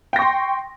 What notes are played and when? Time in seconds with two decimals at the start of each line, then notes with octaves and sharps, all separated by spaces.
0.13 G5
0.16 A#6
0.19 C#6
0.22 C6